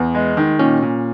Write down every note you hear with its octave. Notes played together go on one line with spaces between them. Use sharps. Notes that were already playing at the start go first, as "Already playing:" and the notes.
Already playing: E2 B3
G#3
D#3
A#2 C#4
A#2